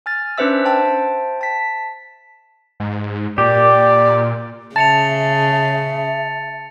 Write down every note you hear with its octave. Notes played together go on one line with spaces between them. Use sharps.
G#5 F6 A6
C#4 D4 B4 C5 E5 E6
C5 E5 G5 A5
A5 B6
G#2
A#2 G4 D5
C#3 E5 A5 A6 C#7 F7